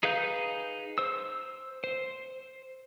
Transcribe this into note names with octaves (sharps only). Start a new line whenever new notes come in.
D#4 G#4 B4 F5 G6
C5 E6
C5